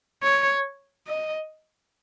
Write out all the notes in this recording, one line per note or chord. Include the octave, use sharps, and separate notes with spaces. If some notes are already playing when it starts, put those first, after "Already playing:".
C#5
D#5